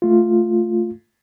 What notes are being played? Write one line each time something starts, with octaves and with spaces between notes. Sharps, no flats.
A3 F4